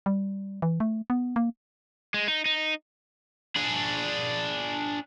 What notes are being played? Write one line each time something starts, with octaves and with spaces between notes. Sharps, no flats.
G3
E3
A3
B3
A#3
G#3
D#4
D#4
D4 G#4